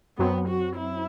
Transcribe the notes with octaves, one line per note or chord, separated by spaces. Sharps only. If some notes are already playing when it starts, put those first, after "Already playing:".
F#2 F#3 B3 C4
F#4
E4